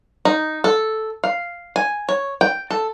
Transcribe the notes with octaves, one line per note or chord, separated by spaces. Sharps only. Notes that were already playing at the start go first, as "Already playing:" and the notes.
D#4
A4
F5
G#5
C#5
G5
A4